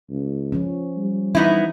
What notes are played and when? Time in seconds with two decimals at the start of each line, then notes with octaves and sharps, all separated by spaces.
0.10 C#2
0.52 F3 C#4
0.97 G3
1.35 E3 B3 D#4 E4